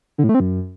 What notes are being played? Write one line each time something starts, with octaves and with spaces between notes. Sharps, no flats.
D3
A2
A3
C4
F#2